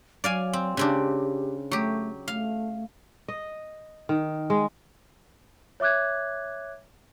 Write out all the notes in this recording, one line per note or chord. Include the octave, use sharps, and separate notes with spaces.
F#3 D5 F5 G#5
C4
C#3 C4 D4 G4
F#3 A3 G4
A3 F5
D#5
D#3
G#3
C#5 E5 D6 F#6 G#6